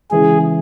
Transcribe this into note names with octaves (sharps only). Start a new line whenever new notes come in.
C#3 E3 G#3 G#4